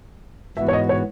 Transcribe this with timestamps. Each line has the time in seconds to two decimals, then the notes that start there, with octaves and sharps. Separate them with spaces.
0.57 G#2 E3 B3 F#4 E5
0.68 C#5
0.73 D#5
0.89 C#5